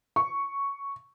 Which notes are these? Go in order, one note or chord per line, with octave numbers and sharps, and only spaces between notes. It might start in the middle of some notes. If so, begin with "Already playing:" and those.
C#6